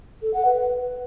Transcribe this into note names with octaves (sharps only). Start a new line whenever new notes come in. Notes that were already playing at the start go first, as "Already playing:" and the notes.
A4
F#5
B4